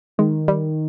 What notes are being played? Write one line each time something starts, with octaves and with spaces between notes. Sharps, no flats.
D#3 G#3
G3